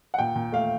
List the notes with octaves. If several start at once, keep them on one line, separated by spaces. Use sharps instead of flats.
F#5
A#2 G5
A#2
A3 F5